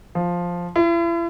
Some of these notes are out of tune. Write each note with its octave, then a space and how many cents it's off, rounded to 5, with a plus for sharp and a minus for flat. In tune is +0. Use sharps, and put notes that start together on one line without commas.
F3 +5
E4 +40